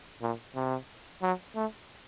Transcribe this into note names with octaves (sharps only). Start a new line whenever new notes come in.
A#2
C3
F#3
A3